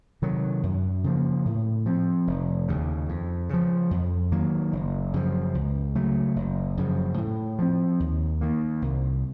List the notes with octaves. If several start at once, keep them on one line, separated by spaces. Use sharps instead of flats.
C3 D#3 F#3
F#2
C#3 F3 A#3
A2
F3 C4
F1
D#2 C#3
F2
C#3 F3
F2
D#3 F#3 A#3
F#1
F#2 C#3 F3
C#2
C#3 F#3 A3
F#1
F#2 C#3 F3
A2
F3 C4
D#2
D#3 A#3
C2